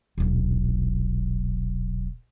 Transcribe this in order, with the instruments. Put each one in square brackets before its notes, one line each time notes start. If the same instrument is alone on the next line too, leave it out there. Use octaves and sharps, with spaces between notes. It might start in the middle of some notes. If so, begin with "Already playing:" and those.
[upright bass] D#1 B1